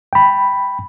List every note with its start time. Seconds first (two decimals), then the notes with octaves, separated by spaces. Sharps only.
0.13 G5 B5